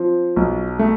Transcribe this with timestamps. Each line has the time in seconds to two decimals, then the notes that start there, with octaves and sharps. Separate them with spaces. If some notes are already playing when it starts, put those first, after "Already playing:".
Already playing: F3 C4
0.36 B1
0.79 A3